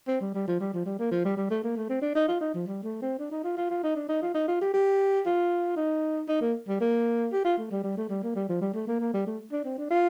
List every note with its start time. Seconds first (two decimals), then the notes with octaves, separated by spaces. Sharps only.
0.08 C4
0.21 G3
0.34 G3
0.48 F3
0.60 G3
0.73 F3
0.85 G3
0.99 A#3
1.11 F3
1.25 G3
1.37 G3
1.50 A3
1.63 A#3
1.76 A3
1.89 C4
2.01 D4
2.15 D#4
2.28 F4
2.41 D#4
2.54 F3
2.66 G3
2.83 A3
3.02 C4
3.19 D4
3.31 D#4
3.44 F4
3.57 F4
3.70 F4
3.83 D#4
3.96 D4
4.09 D#4
4.22 F4
4.34 D#4
4.48 F4
4.61 G4
4.74 G4
5.26 F4
5.76 D#4
6.28 D#4
6.41 A#3
6.68 G3
6.81 A#3
7.33 G4
7.44 F4
7.58 A3
7.71 G3
7.84 G3
7.97 A3
8.09 G3
8.23 A#3
8.35 G3
8.49 F3
8.61 G3
8.74 A3
8.87 A#3
9.00 A#3
9.13 G3
9.27 A3
9.52 D4
9.65 C4
9.78 D4
9.90 F4